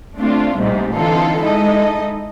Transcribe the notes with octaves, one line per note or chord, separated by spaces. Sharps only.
A3 C4 D4 F4
A#1 G#2 C3 G3 A3
D3 E3 C4 D#4 F4 A4
G#3 D#4 E4 A4 D#5